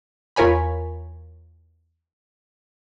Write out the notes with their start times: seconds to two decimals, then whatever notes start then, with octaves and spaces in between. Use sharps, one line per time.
0.36 E2 F4 A#4 C#5 G#5 B5